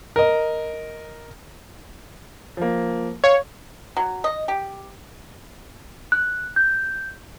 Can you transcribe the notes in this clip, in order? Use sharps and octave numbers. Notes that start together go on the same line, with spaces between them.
A#4 D#5
F3 A#3
C#5 F5
F#3
D#5
G4
F#6
G6